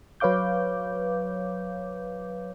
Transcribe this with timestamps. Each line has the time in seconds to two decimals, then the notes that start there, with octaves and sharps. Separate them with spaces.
0.20 F#3 B4 C#5 F5 D6 G6